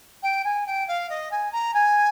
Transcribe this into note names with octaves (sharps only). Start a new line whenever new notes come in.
G5
G#5
G5
F5
D#5
G#5
A#5
G#5